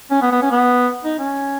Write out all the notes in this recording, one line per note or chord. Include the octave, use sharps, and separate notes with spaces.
C#4
B3
B3
C#4
B3
D#4
C#4